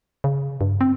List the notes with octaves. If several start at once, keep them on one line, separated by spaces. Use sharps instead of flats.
C#3
G2
C4